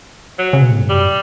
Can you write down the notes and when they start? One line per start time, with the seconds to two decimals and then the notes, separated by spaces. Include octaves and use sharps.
0.39 F#3
0.53 C#3
0.62 B2
0.71 A2
0.80 G2
0.89 F#2 G3